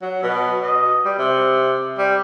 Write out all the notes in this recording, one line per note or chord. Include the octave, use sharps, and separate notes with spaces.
F#3
B2
D#5
G3
C3
G3